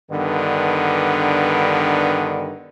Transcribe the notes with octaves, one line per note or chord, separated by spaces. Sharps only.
G2 D3 D#3 B3